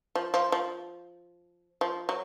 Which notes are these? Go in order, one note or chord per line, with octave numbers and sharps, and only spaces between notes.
F3
F3
F3
F3
F#3